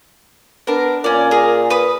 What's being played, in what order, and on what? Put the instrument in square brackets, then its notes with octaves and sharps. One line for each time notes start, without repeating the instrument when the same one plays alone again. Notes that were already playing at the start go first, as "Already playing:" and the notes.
[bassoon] B3 [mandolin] D4 A#4
[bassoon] A#2 [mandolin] C#4 D5
[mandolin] G#4 A#4
B4 D#6